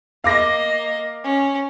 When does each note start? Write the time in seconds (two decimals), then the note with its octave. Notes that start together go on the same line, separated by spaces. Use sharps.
0.24 A#3 D#5 F5 D6 A#6
1.24 C#4